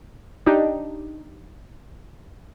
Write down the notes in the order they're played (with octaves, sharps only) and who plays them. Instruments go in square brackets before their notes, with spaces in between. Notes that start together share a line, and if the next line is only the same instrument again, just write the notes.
[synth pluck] D4 D#4 G4